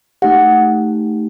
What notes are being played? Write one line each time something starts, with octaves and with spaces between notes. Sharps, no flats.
A3 D#4 G4 F#5